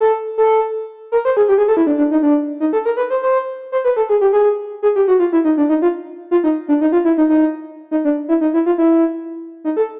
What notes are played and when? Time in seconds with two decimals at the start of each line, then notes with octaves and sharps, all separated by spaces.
0.01 A4
0.38 A4
1.12 A#4
1.25 C5
1.37 G#4
1.49 G4
1.58 G#4
1.68 A4
1.77 E4
1.87 D4
1.98 D4
2.11 D#4
2.23 D4
2.60 D#4
2.73 A4
2.85 A#4
2.97 B4
3.10 C5
3.23 C5
3.72 C5
3.85 B4
3.96 A4
4.09 G#4
4.21 G4
4.33 G#4
4.83 G#4
4.96 G4
5.08 F#4
5.20 F4
5.33 E4
5.45 D#4
5.58 D4
5.69 D#4
5.82 F4
6.31 F4
6.44 D#4
6.68 D4
6.81 D#4
6.92 F4
7.05 E4
7.18 D#4
7.30 D#4
7.91 D#4
8.05 D4
8.29 E4
8.41 D#4
8.54 E4
8.66 F4
8.78 E4
9.64 D#4
9.77 A4